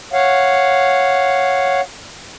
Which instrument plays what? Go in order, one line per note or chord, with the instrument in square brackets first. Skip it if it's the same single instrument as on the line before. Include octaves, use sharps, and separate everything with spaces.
[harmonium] C#5 F5 F#5